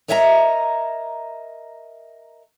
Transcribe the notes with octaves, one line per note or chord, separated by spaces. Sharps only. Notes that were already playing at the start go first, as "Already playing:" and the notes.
A#4 C#5 D#5 E5 F#5 A#5